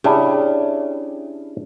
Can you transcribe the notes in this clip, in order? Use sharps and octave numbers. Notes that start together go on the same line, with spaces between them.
C#3 D4 E4 G4